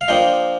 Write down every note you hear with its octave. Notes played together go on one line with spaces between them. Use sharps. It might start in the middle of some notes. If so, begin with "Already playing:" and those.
F5
F3 A#3 D4 F4 D#5 G5